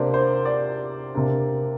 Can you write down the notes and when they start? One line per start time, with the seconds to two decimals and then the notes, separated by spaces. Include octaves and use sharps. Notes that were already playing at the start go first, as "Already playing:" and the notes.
Already playing: C3 A#3 D4 C5 D5
0.14 C5
0.45 D5
1.15 C3 A#3 D4